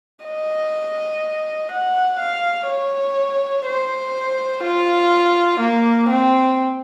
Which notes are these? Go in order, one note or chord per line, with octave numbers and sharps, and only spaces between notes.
D#5
F#5
F5
C#5
C5
F4
A#3
C4